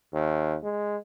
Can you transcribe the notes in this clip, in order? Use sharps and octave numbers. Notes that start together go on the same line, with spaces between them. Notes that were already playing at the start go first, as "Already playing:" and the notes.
D#2
G#3